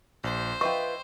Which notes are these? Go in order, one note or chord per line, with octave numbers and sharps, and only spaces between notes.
A#1 C5
F4 B4 D#5 E5 G5 C#6